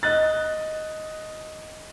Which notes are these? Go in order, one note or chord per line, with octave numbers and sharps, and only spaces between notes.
D#5 F#6 A6